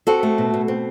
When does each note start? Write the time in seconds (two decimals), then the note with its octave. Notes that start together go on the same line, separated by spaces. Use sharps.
0.07 C4 F#4 A4
0.23 A3
0.38 B2
0.54 B2
0.68 C4